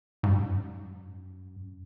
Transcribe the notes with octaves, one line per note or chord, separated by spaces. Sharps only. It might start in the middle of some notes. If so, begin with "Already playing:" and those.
G#2
F#2